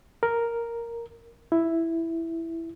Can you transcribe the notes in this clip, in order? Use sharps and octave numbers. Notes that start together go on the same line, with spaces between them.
A#4
E4